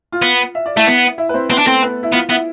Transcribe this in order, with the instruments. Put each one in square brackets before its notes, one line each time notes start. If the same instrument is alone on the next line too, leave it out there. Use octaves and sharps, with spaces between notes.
[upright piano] F4
[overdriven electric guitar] B3
[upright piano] E5
D5
[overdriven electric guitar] A3 [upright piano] E4 E5
[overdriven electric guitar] B3
[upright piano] E4 E5
B4
C4 C5
[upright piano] B3 B4 [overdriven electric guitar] C4
[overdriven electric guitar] D4
[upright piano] A3 A4 [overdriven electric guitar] C4
[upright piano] B3 B4
E4 E5
[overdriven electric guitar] B3 [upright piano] F4 F5
[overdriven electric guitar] B3 [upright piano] E4 E5